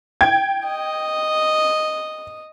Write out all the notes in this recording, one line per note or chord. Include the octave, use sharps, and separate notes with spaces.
G5 G#6
D#5